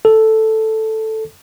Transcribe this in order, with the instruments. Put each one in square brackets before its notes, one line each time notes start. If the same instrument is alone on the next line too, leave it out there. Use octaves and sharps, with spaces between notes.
[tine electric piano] A4